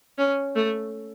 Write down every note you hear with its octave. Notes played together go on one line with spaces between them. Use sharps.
C#4
A3